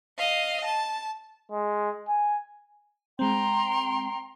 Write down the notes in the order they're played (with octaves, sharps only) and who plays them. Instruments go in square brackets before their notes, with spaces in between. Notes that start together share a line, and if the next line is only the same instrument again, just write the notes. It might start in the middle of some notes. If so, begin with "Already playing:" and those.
[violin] D#5 F5
A5
[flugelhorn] G#3
G#5
[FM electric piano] G#3 C4 [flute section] G5 A#5 C6